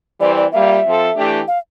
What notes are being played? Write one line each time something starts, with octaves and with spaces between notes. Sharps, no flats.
E3 G3 C4 D5
D5
G3 A#3 F4 E5
F3 C4 F4 A4
E3 A3 D4 G4
F5